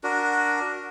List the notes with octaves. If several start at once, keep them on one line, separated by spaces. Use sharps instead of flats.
D4 F#4 A#4